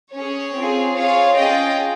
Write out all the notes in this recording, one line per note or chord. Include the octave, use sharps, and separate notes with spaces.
C#4 G#4 C#5
C4 F4 G#4
C4 F4 G#4 C#5 F5
C#4 F4 G#4 D#5 G5